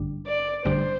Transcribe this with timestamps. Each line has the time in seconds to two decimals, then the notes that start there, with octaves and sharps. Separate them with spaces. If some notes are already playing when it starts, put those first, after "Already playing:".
Already playing: A1 G2 D3 G3 D4
0.27 D5
0.65 A1 G2 D3 G3 D4 C5